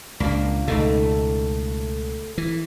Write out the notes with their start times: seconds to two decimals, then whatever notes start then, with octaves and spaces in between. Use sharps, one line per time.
0.20 C#2 A#2 A#3 D4
0.68 C#2 B2 A3 D#4
2.38 E3